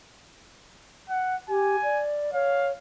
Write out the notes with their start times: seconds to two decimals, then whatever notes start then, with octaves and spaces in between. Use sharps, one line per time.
1.09 F#5
1.49 G4 G#5
1.83 D5
2.34 C#5 F5